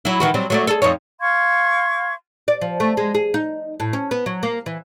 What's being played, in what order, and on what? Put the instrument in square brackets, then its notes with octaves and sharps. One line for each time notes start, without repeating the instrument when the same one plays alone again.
[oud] F#3 E4
D#3 E3 F#4
F#3 G3 C4
F#3 A3 D5
G#4 A4
F2 D#4 C#5
[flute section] F5 C6 C#6 G#6
[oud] D5
F3
A3
G#3
G#4
D#4
A2
C#4
B3
F#3
A#3
E3